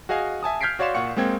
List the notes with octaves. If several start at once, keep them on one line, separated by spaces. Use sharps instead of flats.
F#4 G#4 D#5 F5 G#5
E5 G#5 A5 D#6
F6 G6 G#6 B6 C7 D7
F#4 C#5 D5 F5 C6 E7
A#2 F4 F#5 C#6 C#7
G#3 A#3 C4 G5 G#6